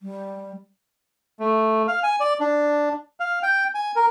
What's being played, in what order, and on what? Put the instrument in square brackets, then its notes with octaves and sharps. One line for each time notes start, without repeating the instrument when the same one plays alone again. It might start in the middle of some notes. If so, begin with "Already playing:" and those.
[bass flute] G3
[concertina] A3
F5
G#5
D5
D4
F5
G5
G#5
A#4